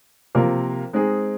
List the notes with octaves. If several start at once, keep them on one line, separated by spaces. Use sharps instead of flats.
C3 F3 A#3 F4 A#4
G#3 C4 D#4 G#4